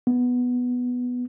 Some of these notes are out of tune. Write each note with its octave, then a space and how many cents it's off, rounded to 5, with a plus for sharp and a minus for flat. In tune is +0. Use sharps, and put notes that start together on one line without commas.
B3 +0